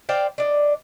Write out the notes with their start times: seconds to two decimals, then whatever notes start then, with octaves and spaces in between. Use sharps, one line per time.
0.09 C5 D5 F5 G5
0.38 D4 D5 D#5